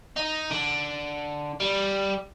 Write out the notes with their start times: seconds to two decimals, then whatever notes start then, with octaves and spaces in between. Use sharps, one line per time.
0.17 D#4
0.51 D3
1.60 G3